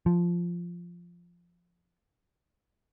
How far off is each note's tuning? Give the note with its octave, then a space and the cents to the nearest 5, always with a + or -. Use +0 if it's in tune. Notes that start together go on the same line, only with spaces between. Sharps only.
F3 -5